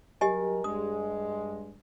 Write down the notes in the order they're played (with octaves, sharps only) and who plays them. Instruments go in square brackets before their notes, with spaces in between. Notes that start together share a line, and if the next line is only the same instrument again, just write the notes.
[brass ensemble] F#3 G3 A#4 [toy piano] G4 D#5 G#5
[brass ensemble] G2 G#3 [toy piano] D#6